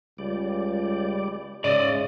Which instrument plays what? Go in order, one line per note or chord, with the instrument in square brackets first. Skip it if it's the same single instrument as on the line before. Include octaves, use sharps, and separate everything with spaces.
[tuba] C#2 [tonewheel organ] G3 D5
[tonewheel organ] G#2 [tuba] C#3 [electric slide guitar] D5 D#5